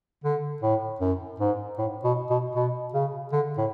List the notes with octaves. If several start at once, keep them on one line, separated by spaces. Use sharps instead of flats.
D3
A2
F#2
G#2
A2
B2
B2
B2
C#3
D3
A2